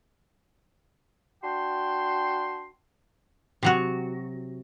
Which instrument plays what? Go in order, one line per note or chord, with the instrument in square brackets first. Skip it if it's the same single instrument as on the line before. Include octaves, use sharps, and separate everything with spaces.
[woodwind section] D4 F#4 G5 A5 C6
[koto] C3 F#3 F#4